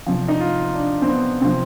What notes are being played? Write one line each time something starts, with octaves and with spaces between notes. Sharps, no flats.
C3 F3
D#4
F4
D4
C4
B3
C3 F3 C4